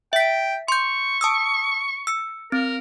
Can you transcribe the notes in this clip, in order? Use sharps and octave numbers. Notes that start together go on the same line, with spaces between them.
E5 G5 B6
C6 C#6 G6
A5 D#6 E6
E6 C#7
C4 A#4